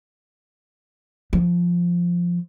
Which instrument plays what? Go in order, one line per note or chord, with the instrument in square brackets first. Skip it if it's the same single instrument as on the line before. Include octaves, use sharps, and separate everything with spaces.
[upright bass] F3